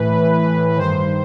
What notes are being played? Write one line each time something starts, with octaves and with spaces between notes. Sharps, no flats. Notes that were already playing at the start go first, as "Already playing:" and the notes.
Already playing: A2 E3 B4
G2 D#3 C5